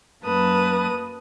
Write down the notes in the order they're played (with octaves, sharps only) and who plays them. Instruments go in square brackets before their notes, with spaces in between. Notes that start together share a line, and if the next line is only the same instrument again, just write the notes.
[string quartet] F#2 A#3 B4 A5 D#6